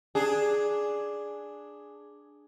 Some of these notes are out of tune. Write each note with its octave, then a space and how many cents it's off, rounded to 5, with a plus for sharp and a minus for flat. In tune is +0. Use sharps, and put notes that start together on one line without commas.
D4 +0 G#4 +0